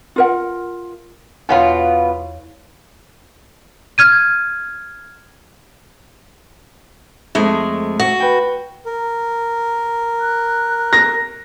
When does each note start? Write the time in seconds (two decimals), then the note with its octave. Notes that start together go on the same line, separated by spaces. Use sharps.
0.16 F4 A#4 F#5
1.49 E2 B2 B3 F4 C#5 F5
3.98 F6 G#6 D#7
7.35 F2 G#3 A3
8.00 F#4
8.20 B4 G5
8.86 A#4
10.21 F#6
10.93 A#6